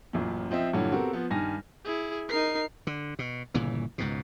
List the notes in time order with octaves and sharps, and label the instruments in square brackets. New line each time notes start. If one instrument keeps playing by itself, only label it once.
[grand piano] A1 F#2 A#2
F3 C4 D#5 E5
G2 A#2 D3 E3 F#3
B3 C4 F#4 G4 A4 A#4
F3 B3
G2 D#3 G#5 F6 A#6
[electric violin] E4 G#4
[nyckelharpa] D#4 A#4 [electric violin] C7
[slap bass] D3
B2
G1 A#2 C#3 E3
C#2 G#2 B2